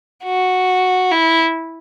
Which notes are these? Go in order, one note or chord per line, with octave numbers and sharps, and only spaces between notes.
F#4
E4